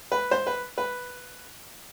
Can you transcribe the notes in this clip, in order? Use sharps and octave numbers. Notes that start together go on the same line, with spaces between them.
B4
C5
B4
B4